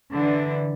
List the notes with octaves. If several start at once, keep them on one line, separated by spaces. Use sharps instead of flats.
D3 E3